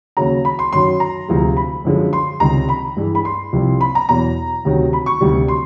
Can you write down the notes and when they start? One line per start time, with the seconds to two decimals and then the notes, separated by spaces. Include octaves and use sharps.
0.17 D#2 C#3 F#3 A#5
0.45 B5
0.59 C6
0.73 F#2 D#3 F#3 C6
1.00 A#5
1.28 D2 C3 F3 G#3
1.57 B5
1.85 F#2 D3 F3 G#3
2.13 C6
2.40 C#2 C3 D#3 G3 A#5
2.69 B5
2.97 G2 E3 G#3
3.15 B5
3.25 C6
3.53 C2 C3 F3
3.81 B5
3.95 A#5
4.09 E2 B2 F#3 A#5
4.65 D2 C3 D#3 F#3
4.93 B5
5.06 C#6
5.21 D2 C3 D#3 G3
5.48 C6